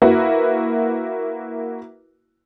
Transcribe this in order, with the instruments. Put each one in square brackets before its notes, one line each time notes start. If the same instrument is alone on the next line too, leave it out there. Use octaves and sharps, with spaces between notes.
[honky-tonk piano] A#3 E4 F#4 B4